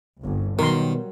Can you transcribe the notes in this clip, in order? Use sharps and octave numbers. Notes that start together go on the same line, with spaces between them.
G1 C2
B2 D#3 F#3 G3 A#4 C6